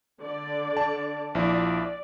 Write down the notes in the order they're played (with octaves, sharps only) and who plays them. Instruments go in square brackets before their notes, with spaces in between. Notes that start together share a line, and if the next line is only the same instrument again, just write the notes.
[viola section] D3 D5
[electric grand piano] A5
[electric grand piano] A#1 F3 E4 [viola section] D5